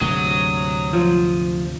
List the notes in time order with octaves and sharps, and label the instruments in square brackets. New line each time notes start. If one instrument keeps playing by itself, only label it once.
[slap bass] D2 G#2 C3 [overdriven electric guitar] F#3 [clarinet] D#6
[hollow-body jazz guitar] F3